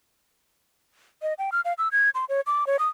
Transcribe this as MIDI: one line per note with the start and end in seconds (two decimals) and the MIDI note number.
1.22 1.34 75
1.38 1.50 79
1.52 1.61 89
1.65 1.73 77
1.78 1.88 88
1.92 2.10 92
2.15 2.25 84
2.29 2.41 73
2.47 2.67 86
2.67 2.77 73
2.79 2.88 87